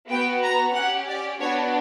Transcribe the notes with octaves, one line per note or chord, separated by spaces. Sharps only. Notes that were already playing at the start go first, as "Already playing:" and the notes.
B3 F#4 G5
A#5
C#4 G4 F#5
D5
B3 D4 F#4 C#5